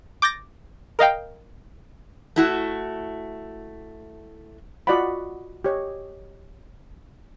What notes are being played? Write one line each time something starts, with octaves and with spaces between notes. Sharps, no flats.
D6 G6 A6 A#6
A#4 D#5 F5 G5
A3 E4 F#4
F4 F#4 D5 D#5 F#5 B5
G4 C#5 D#5